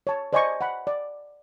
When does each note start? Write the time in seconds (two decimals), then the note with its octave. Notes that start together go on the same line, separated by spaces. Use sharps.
0.07 C#5 A5
0.33 C5 D5 D#5 G#5 B5 C#6
0.61 F#5 B5
0.87 D5